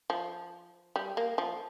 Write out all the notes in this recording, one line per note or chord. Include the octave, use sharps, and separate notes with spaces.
F3
G3
A#3
F3